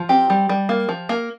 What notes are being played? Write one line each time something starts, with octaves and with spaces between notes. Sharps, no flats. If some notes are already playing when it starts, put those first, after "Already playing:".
Already playing: F3
C4 G4
G3
G3
A#3
F3
A#3